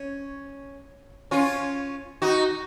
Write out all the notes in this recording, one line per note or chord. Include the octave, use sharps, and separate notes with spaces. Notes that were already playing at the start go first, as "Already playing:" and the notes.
Already playing: C#4
C#4 F4
D#4 F#4